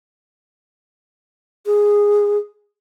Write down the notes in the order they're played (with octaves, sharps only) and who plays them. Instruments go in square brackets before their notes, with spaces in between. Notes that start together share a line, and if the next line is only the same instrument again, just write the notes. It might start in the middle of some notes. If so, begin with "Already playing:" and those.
[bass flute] G#4